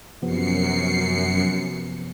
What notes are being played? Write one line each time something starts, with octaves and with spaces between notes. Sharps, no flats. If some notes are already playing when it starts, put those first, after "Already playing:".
F#2 C3 F3 B3 C7 C#7